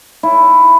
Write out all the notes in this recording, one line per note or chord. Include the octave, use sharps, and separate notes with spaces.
E4